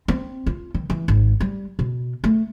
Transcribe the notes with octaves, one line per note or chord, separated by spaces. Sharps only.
C4
F4
D#3
E3
G#1
G3
B2
A3